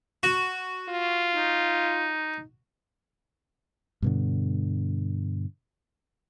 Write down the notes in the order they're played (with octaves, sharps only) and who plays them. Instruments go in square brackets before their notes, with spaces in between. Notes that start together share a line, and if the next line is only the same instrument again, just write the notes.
[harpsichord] F#4
[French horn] F4
[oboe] D#4
[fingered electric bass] G2 B2 D3